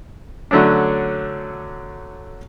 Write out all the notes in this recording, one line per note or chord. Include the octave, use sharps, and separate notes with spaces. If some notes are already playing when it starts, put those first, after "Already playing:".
D3 F#3 A3 C#4 D4